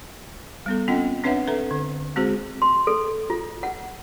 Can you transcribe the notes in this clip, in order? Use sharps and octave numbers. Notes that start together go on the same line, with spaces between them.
G3 B3 A4
C4 C#4 F4 D#5 F#5 G5
C4 D4 B4 C#5 E5 F#5
A4 B4 E5 A#5
D3
G#3 C4 F#4 G#4 C5
C6
A4
F4
F#5